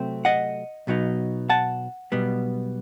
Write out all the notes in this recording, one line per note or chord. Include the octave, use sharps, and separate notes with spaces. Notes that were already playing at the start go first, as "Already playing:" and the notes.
Already playing: C3 F#3 A3 C4
D#5 F#5
B1 B2 F#3 B3 D#4
F#5 A5
B1 B2 G3 B3